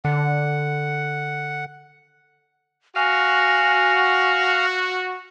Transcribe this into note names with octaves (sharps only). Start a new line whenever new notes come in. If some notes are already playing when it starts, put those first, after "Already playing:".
D3 F#5
F#4 F5 G#5 A#6